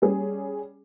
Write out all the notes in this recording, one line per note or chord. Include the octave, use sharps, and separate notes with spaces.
G3 C#4 G#4